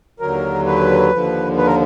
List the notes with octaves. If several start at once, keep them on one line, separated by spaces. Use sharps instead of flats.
D#2 D3 F#3 A#4
B4
D#2 D3 F3
B4
A#4